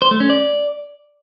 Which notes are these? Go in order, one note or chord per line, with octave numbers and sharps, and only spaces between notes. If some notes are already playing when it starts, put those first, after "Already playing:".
C5
A3
C#4
D5